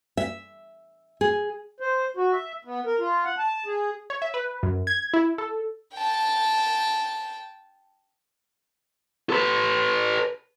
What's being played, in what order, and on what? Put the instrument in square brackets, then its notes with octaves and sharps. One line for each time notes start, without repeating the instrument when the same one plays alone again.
[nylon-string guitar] E5
G#4
[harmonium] C5
F#4
E5
B3
A#4
F4
F#5
A5
G#4
[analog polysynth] C#5
E5
B4
F#2
G#6
E4
A4
[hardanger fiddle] G5 A5
[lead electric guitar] A4 B4